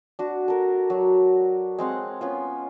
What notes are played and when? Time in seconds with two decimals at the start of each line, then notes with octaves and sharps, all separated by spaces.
0.19 D4 F#4
0.48 A4 A#4
0.90 F#3
1.78 G#3 C4 F5 F#5
2.21 B3 C#4 F4